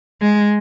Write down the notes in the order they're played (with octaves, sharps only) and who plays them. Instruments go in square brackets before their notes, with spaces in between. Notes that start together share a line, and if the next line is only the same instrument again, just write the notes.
[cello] G#3